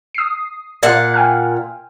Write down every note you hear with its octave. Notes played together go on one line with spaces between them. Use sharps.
D#6 C7
A#2 F5 F#5
G5 G#5 F6